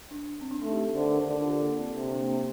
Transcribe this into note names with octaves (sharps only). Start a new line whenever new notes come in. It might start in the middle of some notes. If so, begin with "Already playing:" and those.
D4
C4
D4
A3 D#4
G4
A4
D3 C5
A#4
D3 A4
F4
G4
A#3
C4
C3
C4
D4
A#3
C4